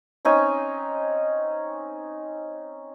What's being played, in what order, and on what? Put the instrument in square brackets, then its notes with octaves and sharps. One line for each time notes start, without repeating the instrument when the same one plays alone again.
[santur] C4 C#4 D#4 G#5